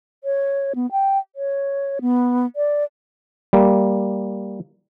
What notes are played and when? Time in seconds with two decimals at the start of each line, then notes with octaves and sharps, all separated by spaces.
0.24 C#5
0.75 B3
0.92 G5
1.36 C#5
2.01 B3
2.56 D5
3.53 G3 A#3